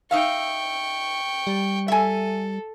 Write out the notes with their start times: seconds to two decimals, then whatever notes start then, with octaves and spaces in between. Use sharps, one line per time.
0.11 D#4 E5 F5 G5 C#6
1.47 G3
1.88 A4 E5 G#5